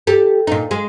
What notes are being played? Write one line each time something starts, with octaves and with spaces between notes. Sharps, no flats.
G4 A4
A#2 D#4
G#3